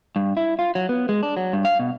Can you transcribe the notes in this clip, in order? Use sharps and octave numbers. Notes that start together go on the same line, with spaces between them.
G2
E4
F4
F#3
B3
G#3
D4
F#3
G2
F5
B2